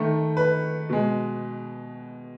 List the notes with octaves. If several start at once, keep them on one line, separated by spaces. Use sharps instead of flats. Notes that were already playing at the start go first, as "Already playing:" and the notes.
Already playing: D#3 A3
B4
B2 G#3